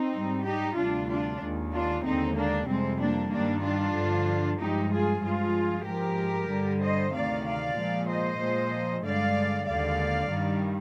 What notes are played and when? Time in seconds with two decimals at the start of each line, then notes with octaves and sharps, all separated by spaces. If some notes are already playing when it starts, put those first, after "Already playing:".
Already playing: C4 D#4
0.13 G#2 G3
0.45 D#4 G4
0.77 D2 C3 G3 D4 F4
1.09 D4 F4
1.40 D#2 D#3 G#3
1.73 D4 F4
2.04 D#2 D3 G#3 C4 D#4
2.36 A#3 D4
2.68 F2 C3 G3 G#3 C4
2.99 A#3 D4
3.31 G2 D#3 G3 A#3 D4
3.63 D4 F4
3.95 G2 D3 F3
4.59 G2 F3 G#3 D#4 G4
4.91 F4 G#4
5.22 G2 F3 G#3 F4 G#4
5.86 G#2 F3 G#3 G4 A#4
6.49 G2 D3 G3
6.81 C5 D#5
7.13 D2 C3 D#3 D5 F5
7.45 D5 F5
7.76 A#2 F3 G#3
8.08 C5 D#5
8.40 A#2 F3 G#3
9.04 G2 D3 G#3 D5 F5
9.67 D#2 D3 G#3 D5 F5
10.31 G2 D#3 G3